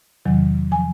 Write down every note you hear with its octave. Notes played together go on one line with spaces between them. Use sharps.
E2 C3 D#3 F#3
F3 G#5